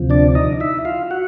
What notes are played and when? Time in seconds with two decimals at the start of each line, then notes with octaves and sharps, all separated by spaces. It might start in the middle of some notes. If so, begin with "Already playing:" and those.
Already playing: D2 C3 F3
0.10 D4 D5
0.35 D#4 D#5
0.60 E4 E5
0.85 F4 F5
1.11 F#4 F#5